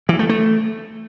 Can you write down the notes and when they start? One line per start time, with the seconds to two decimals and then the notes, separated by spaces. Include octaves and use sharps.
0.09 E3
0.19 A3
0.29 A3